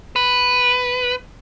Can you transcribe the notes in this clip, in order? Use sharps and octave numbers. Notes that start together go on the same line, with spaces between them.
B4